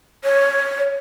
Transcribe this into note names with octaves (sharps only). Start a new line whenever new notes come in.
C#5